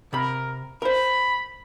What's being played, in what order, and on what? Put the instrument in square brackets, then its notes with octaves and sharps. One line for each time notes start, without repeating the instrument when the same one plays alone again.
[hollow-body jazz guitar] C3 B5 [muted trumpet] A#4
[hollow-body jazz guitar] A#4 C5 [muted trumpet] B5